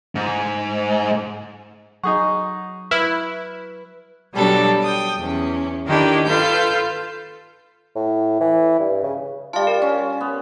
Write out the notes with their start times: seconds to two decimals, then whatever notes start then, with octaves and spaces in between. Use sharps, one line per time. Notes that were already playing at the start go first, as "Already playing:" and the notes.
0.15 G#2
2.04 F#3 D#4 G#4 F#5 C#6
2.91 E4 B4 F6
4.34 B2 F#3 G3 D4 A4
4.83 G5 D#6
5.18 E2 C#4
5.87 D#3 D4 E4 G4 A4
6.25 F4 A4 B4 G6
7.96 A2
8.40 E3
8.79 G2
9.03 C#3
9.53 G3 F4 F5 A5
9.67 A#4
9.82 C#4
10.21 B3